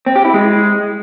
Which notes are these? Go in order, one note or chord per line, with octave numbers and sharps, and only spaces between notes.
C4
G4
E4
G#3